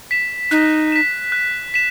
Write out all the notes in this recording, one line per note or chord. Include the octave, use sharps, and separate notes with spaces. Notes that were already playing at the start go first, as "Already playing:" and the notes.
B6 E7
D#4 F#6
B6 E7
F#6
B6 E7